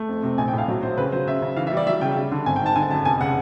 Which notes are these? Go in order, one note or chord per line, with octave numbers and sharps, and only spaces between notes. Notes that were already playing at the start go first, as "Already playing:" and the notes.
Already playing: A3
F2
C3
A#1 G#5
G5
A2
F5
F#3
A#1 C5
C#3 B4
F#3 C5
C#3 E5
C#3
E3 F5
E5
G3
D5
F#3 E5
C#3 G5
G3
D3
G#1 G#5
G5
G#2 A5
D3 G#5
F#2 A5
F1 G#5
C#3 F#5